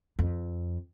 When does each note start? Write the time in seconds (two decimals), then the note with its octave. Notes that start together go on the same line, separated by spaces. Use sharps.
0.19 F2